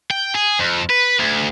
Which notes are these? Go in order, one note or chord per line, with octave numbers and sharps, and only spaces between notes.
G5
G#4
F2
B4
D2